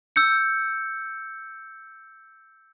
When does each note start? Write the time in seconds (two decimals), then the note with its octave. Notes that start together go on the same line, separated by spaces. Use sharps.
0.16 E6 G6 C#7